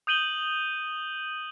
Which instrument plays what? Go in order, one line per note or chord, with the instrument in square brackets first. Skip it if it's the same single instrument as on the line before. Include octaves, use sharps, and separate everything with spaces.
[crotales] D#6 G6 D#7 F#7 G7